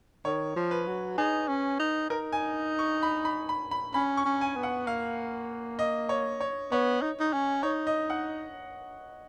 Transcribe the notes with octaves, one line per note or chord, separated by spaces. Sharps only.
D#3 C#5
F3
B4
F#3
D#4 G#4
C#4
D#4
D#4 A#4
G#5
C#6
B5
B5
B5
B5
C#4 B5
C#6
C#4
G#5
B3
F#5
A#3 F5
D#5
C#5
C#5
B3 C#5
D#4
D#4
C#4
D#4 C#5
D#5
F#5